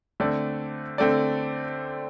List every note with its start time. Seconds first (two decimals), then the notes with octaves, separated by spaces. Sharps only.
0.20 D3 A3 C4 A4 D5
0.98 D3 A3 C4 A4 D5